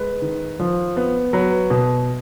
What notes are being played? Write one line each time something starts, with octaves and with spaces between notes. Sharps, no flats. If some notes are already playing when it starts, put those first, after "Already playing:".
Already playing: G#3 B4
D#3
F3
B3
F#3 B4
B2